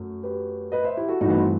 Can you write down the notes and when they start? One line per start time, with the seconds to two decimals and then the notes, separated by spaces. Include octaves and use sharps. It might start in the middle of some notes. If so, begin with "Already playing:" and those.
Already playing: F#2 F#3 A3
0.23 G4 B4
0.72 B4 D#5
0.84 C5 E5
0.97 E4 G4
1.09 F#4 A4
1.21 G2 E3 A3 D#4 F#4
1.30 B3
1.37 C4